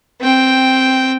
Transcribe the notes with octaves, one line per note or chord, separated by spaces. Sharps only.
C4 G5